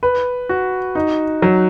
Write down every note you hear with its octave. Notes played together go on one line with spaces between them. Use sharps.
B4
F#4
D#4
F#3